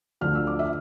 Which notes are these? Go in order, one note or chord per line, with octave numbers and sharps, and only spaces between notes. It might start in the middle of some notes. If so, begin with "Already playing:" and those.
D2 D3 F3 F6
E6
D6
E5